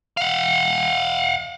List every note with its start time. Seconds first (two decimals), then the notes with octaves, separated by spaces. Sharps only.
0.17 F5 F#5